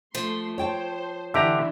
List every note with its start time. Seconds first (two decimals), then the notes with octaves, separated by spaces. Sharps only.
0.15 F3 A3 C6
0.58 C5 C#5 G5 A5
1.34 D3 E3 D4 G4 E5 A#5